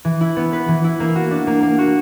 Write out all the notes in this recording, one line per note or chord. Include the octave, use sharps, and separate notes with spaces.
E3
E4
B3
B4
E3
E4
A#3
F#4
D4
A#3
A#3
F#4